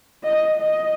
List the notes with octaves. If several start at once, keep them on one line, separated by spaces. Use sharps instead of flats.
D#5
D#5